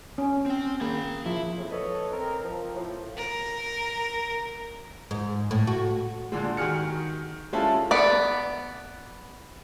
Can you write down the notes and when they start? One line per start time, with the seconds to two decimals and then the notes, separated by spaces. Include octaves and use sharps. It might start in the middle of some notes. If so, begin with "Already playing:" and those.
0.18 C#4
0.46 C4 G5
0.81 A#3 G#4 B5
1.26 F3 E4
1.57 F2 A2 C#3
1.71 A4 B4 C#5 D#5
2.13 C4 A#4
2.43 F3
2.76 A2 F3
3.17 A#4
5.11 G#2
5.51 A2
5.67 F#4
6.32 A#2 D3 G#3
6.57 D#3 F#4 G#4 F6 C#7
7.53 G#3 C#4 E4 F4 G4 A4
7.91 B3 D5